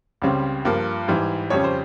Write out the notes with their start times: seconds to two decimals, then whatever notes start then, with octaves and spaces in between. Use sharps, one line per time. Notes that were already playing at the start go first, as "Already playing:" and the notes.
0.22 C#2 C#3 G3 C4
0.65 G2 F3 A#3
1.08 G#2 E3 G3
1.50 F2 C#3 G3 C#4 C#5
1.64 C5